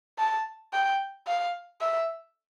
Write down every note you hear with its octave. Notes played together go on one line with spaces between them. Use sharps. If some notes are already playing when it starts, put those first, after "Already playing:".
A5
G5
F5
E5